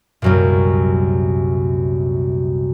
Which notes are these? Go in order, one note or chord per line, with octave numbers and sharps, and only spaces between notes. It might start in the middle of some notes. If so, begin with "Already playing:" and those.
C2 F#2 A#2